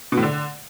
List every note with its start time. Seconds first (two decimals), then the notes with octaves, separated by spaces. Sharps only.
0.12 B2
0.17 A2
0.22 D3